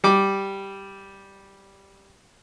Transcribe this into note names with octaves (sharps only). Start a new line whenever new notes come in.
G3 D6